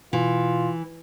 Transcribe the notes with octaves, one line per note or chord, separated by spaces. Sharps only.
B2 E3 F4